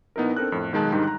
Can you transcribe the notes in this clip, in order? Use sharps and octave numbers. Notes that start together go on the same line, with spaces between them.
A#1 B3 D#4 E4 A#4
C4 D4 A4 A#4 E6 F#6
F2 A2
B1 D#3 G#3 A5 F#6
G#2 D3 D#3 G3 D#4
A#5 F#6